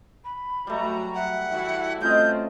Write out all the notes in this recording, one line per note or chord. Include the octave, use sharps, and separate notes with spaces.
B5
F#3 G3 A3 F#4 A#5
E5 F#5
E3 E4 F#4
C#3 A3 C4 F4 D#5 G6